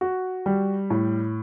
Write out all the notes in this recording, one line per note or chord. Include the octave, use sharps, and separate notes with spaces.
F#4
G3
A2